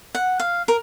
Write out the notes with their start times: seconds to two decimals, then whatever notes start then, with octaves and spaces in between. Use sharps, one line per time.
0.15 F#5
0.40 F5
0.68 A#4